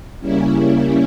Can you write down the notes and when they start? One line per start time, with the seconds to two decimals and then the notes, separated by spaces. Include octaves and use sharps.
0.20 C#3 G3 A#3 C#4 E4